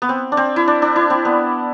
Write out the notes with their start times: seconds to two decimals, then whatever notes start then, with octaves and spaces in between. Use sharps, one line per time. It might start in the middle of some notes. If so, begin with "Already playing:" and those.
0.02 B3
0.09 C4
0.32 D4
0.37 C4
0.56 E4
0.68 D4
0.82 D4
0.96 E4
1.10 C4
1.25 B3